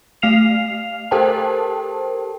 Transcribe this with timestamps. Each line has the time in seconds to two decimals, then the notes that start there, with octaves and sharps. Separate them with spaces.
0.22 A3 F5 F6 C7 F7
1.11 G4 A4 A#4 C5 G5 A5